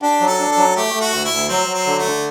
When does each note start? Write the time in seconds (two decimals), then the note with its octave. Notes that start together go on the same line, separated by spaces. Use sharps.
0.02 D4 G4
0.21 F#3
0.27 A4
0.40 D4
0.52 A4
0.57 F#3
0.76 A3 G4
0.94 A3
1.01 F#4
1.12 D2
1.25 E4
1.32 D2
1.49 F#3 C4
1.68 F#3
1.74 C4
1.86 D3
1.99 A3
2.05 D3